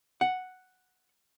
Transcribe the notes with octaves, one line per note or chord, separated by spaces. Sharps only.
F#5